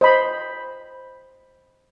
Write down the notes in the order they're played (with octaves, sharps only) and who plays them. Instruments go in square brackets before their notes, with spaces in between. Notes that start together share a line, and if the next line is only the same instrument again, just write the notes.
[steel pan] C5 D#5 B5